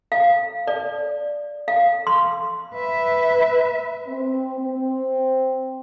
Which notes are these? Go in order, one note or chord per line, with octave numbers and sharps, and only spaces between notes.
F5
D5
F5
C6
B4 E5
C4
C4